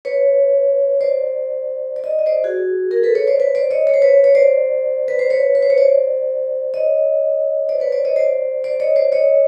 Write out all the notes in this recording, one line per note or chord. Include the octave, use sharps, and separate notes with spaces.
B4 C#5
C5 D5
D5
D#5
D5
D#5
C5 D5
F#4 G#4
G#4 A#4
A4 B4
B4 C#5
C5 D5
B4 C#5
C5 D5
C#5 D#5
C#5
C5
B4 C#5
C#5
C5 D5
B4
C5
B4 C#5
B4
C5
C#5
C5 D5
C#5 D#5
C5 D5
B4 C#5
C5 D5
C#5 D#5
C5 D5
C5 D5
C#5 D#5
C5 D5
C#5 D#5